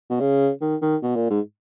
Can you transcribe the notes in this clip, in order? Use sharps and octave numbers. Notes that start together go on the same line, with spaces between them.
B2
C#3
D#3
D#3
B2
A#2
G#2